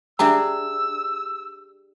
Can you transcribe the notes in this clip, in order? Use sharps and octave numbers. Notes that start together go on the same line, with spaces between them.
D4 G4 G#4 E5 A#5 E6